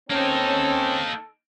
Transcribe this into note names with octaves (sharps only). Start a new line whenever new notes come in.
A#3 C4 C#4 D#4 A4